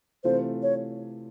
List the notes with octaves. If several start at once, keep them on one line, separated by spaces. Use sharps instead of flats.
C3 E3 A3 C4 F4 C5
C#5